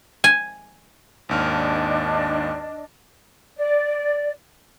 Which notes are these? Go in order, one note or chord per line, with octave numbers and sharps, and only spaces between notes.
G#5
G#1 D#2 D4 D#5 F6
D5